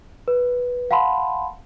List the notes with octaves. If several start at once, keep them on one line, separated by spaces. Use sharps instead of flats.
B4
F5 F#5 A5 B5 C6